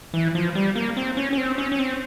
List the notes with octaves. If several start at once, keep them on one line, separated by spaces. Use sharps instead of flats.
E3
F3
G3
A#3
C4
C#4
C#4
C4
C#4
C#4
C4